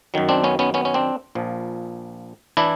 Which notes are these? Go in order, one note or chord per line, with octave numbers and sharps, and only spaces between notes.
F#2 D#3 F#3
C4 D4
B3 C#4
B3 C#4
B3 C#4
C#4
C4 D4
A#1 A#2 F3
E3 D4 E4